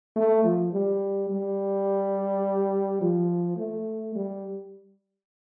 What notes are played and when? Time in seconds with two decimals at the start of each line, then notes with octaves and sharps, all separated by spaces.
0.16 A3
0.44 F3
0.73 G3
1.30 G3
3.01 F3
3.57 A3
4.15 G3